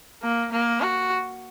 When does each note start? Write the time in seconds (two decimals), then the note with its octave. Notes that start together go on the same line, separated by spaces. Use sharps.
0.23 A#3
0.52 A#3
0.81 F#4